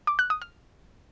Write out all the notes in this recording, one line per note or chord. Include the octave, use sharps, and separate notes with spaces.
D6
F#6
D#6
F6